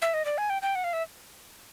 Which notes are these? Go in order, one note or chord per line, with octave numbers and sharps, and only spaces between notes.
E5
D#5
D5
G#5
G5
G5
F#5
F5
E5